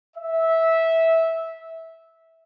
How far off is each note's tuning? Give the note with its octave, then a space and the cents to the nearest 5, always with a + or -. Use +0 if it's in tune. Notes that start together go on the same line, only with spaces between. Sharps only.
E5 -15